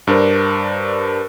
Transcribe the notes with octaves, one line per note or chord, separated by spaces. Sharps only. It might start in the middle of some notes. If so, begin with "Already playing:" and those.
G2 D4 A#4 C5